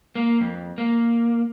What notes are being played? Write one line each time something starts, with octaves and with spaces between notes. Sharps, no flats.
A#3
F2
A#3